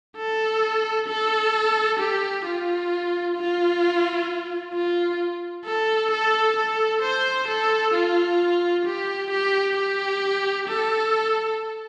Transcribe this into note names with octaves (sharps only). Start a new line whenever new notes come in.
A4
A4
G4
F4
F4
F4
A4
A4
A4
C5
A4
F4
G4
G4
G4
A4